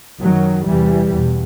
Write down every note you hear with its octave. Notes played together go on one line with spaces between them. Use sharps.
F#2 D#3 F#3
E2 C3 E3 G3
E2 B2